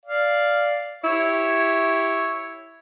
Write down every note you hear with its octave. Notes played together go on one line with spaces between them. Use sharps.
D5 F5
E4 G4 C#5